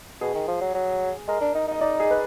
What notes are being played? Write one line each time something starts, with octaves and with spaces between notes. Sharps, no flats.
B2 G#4
D#3
F3
F#3
F#3
G#3 A#4
D4
D#4
D#4 D#5
D#4 D5
G#4
B4